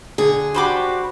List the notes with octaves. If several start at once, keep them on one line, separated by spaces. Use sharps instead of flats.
D3 G#4
D4 F#4 G4 C5 B5 D6